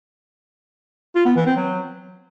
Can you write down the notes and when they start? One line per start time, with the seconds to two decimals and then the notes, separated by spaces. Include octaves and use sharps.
1.15 F4
1.26 B3
1.36 E3
1.46 C4
1.57 F#3